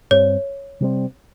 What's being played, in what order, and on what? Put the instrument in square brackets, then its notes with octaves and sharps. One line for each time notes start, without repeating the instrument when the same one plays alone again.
[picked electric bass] G2 G3 C4 [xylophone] C#5
[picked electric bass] C3 G3 C4